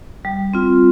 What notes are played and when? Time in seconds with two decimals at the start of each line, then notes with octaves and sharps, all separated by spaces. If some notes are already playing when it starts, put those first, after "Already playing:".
0.25 G3
0.54 C4 F4